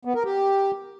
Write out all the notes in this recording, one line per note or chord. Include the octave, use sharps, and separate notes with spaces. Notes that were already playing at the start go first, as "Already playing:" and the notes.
B3
A#4
G4